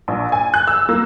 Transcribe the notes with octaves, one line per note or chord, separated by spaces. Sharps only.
A#1
G#5
F#6
E6
A#3